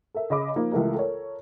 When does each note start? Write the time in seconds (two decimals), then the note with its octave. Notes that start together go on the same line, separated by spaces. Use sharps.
0.14 A4 A#4 E5
0.30 C#3 D#5 B5 D6
0.56 F3 A#3 D#4
0.72 C#2 E3 A3 G4 A#4
0.95 A4 A#4 C#5